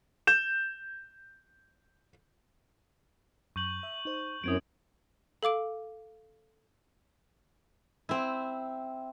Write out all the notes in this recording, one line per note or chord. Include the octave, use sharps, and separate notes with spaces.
G6 E7
F#2 C#6 G6 F#7
E5
D#4 C5
F#2 F#3 C4 E4 D#6 G#6 D7
A4 F5 D6 D7
C4 E4